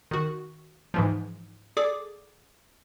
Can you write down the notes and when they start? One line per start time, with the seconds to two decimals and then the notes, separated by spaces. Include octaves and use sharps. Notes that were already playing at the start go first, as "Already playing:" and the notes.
0.11 D#3 F#4
0.94 G#2 E3 F3
1.77 G#4 A4 D5 D6 D#6